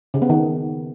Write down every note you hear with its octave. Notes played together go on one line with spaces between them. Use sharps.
C#3
B3
D#3